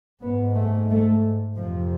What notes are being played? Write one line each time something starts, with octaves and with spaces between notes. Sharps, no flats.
G#2 B3
A3
A3
F2 C3 F3